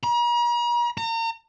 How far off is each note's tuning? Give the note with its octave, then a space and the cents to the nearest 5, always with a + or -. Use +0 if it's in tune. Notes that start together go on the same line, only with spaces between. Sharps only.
A#5 +45
A#5 -35